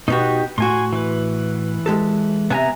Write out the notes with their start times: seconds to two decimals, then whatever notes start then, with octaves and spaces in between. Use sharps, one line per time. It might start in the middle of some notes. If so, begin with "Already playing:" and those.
0.08 B2 B3 D#4 F#4 G4
0.58 A2 F#4 G#5 C6
0.93 E3 B4
1.86 G#3 G4 A4
2.50 C3 B3 E5 G#5 A#5